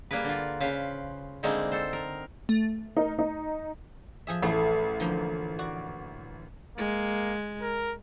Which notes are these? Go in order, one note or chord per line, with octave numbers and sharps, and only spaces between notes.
G3 A#3 G#4 A#4 B4
D3 F4
C#3 B4 C5 F5
D3 G3 G#3 A#3 C4 D#4
A4 C5
A#4
A3
D#4 A#4
D#4
F3 G#4 E5
A1 A3 E4
D3 F3 A#3
F#4 D5
G#3 A#3
A#4